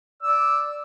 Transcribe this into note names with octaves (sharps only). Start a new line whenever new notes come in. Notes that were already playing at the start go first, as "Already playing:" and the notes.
D5 E6